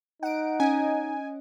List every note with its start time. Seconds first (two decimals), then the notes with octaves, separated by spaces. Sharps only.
0.23 D#4 F#5 D7
0.60 C#4 D#5 G#5